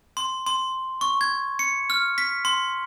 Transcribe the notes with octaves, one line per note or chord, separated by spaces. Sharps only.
C6
C6
C#6
G#6
C#7
F6
B6
C6